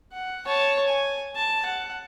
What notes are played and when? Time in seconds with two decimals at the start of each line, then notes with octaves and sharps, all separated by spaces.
0.12 F#5
0.46 C#5 A5
0.88 G#5
1.36 A5
1.65 F#5